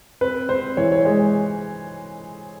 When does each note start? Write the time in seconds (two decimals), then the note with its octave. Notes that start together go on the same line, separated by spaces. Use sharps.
0.21 C4 B4
0.49 C4 C5
0.77 E3 C#5
0.92 C#5
1.05 G#3 C#5